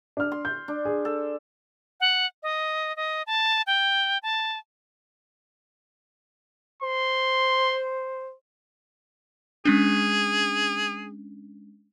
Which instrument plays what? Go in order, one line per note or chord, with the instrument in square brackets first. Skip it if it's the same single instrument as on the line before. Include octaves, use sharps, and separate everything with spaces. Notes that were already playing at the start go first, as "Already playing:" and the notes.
[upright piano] D4 F6
[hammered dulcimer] C6
[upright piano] G6
[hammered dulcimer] D4
[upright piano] G#4
[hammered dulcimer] A4
[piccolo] F#5
D#5
D#5
A5
G5
A5
[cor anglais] C5 [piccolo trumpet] C6
[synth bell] G#3 C#4 D4 [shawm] G#4